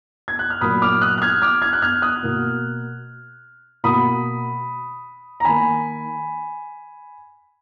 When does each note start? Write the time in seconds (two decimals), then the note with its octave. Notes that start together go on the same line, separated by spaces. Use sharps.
0.28 G#6
0.39 F#6
0.50 F6
0.61 A#2 F#3 A#3 B5 D#6
0.82 D6 F6
1.01 D#6 F#6
1.18 F#6
1.22 F6 G#6
1.42 D6 F6
1.62 F6 G#6
1.73 F#6
1.82 F6 G#6
2.02 D#6 F#6
2.23 B2 A#3
3.84 B2 A#3 B5 D#6
5.40 A#5
5.45 D#3 A#3 G#5 B5